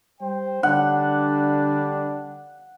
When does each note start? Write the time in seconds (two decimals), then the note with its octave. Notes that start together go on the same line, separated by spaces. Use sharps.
0.21 G3 C5 G5
0.63 D3 G3 D4 F#5